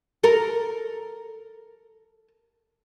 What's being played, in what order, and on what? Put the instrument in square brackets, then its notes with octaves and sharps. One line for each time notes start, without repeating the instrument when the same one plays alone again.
[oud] A4 A#4